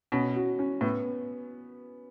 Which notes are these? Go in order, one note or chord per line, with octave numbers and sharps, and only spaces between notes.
B2 C#4
F#4
C#4
A2 B3